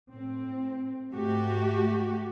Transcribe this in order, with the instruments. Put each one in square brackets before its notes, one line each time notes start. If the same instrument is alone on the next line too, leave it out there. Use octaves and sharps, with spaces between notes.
[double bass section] A2 C4
[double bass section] G#2 [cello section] A3 F#4 G4